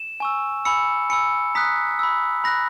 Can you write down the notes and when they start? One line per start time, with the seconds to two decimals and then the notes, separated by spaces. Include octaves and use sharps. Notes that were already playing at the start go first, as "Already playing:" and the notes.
Already playing: E7
0.20 G#5 C#6 E6
0.65 G#5 B5 E6 C#7
1.10 G#5 B5 E6 C#7
1.55 A#5 D#6 F#6 B6
1.99 B5 E6
2.44 B5 F#6 A#6